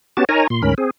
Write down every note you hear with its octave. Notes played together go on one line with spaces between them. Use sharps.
B3 C#4 F#4 G4 A5
D#4 A#4 C#5 G#5 A#5
A#2 C6
D2 G#2 C#4 A#4 B5
C4 G#4